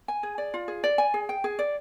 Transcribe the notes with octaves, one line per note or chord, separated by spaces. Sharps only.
G#5
G#4
D5
F4
G#4
D5
G#5
G#4
G5
G#4
D5